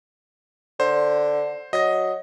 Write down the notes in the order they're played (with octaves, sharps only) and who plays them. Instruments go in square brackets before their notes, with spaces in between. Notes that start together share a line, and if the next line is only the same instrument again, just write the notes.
[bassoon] D3 [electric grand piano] C5
[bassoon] F#3 [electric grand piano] D#5 A#6